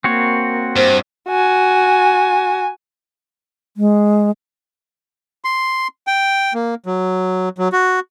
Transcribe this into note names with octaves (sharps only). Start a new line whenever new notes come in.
A#3 C4 F#4 C#5
G2 C5
F#4 G#5
G#3
C6
G5
A#3
F#3
F#3
F#4